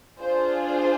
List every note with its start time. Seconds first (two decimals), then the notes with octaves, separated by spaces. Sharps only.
0.18 D4 F4 G#4 C5
0.64 C5